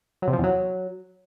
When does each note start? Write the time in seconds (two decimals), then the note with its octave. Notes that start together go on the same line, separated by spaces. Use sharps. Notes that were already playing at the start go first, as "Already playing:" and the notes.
0.22 F#3
0.28 C3
0.33 F3
0.38 E2
0.43 F#3